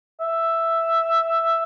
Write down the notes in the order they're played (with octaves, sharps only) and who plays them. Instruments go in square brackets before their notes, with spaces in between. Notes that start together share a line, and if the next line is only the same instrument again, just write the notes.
[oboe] E5